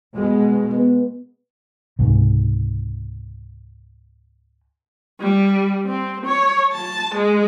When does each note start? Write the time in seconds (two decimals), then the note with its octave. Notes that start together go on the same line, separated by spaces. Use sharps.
0.16 B2 G#3
0.72 B3
1.99 C#2 G#2 C3
5.20 G3
5.86 C4
6.26 C#5
6.72 A5
7.15 G#3